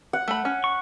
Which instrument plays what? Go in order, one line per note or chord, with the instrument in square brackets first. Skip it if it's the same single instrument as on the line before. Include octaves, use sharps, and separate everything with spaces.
[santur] F#5
[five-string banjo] A3 B5
C#4
[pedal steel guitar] C#6